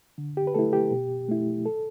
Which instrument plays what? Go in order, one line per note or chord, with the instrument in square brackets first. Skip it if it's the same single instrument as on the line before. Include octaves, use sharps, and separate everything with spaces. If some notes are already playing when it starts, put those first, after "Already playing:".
[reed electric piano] D3
G4
B4
A3 E4 A4
G4
B2
A3 E4
A4